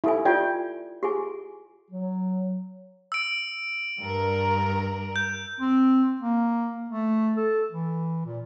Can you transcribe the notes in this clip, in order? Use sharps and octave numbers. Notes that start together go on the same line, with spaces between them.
E4 G4 A4 G#5
F4 G4 D5 G5
G4 G#4 G#5
F#3
E6 D7
G2 A#4
G6
C4
A#3
A3
A4
E3
A#2